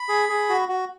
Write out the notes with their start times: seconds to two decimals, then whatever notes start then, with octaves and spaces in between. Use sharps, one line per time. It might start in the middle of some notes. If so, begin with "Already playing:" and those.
Already playing: B5
0.09 G#4
0.29 G#4
0.49 F#4
0.69 F#4